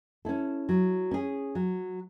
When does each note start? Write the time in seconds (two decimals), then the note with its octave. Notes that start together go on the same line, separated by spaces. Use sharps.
0.25 C#4 E4 A4
0.69 F#3
1.11 C#4 G#4
1.55 F#3